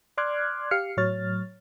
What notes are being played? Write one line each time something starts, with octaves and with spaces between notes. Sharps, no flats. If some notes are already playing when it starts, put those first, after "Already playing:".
D5 C6 D6 F6 F#6 G#6
G4 F5 F6 C7 C#7
A2 F#3 C#5 F6 A6